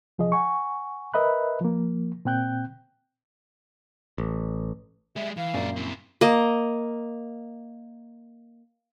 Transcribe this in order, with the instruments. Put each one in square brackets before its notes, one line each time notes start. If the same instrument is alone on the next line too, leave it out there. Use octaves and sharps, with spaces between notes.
[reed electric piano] C2 F3 G#4 D#5
F#5 G#5 C#6
A#4 B4 D#5 E5 B5 F#6
F3 A#3
A#2 C4 G5 F#6 G6
[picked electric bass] A1
[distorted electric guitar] G3 G#3 [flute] E5
[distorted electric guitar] E3 [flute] F5
[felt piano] A#1 F#2 [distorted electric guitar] G#3 D5
[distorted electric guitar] C4 E4
[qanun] A#3 D#5